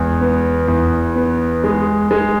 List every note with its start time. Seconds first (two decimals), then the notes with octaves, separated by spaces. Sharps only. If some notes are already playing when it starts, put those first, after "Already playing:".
Already playing: E2 G#3
0.21 B3
0.68 E2
1.16 B3
1.64 G#3
2.11 G#3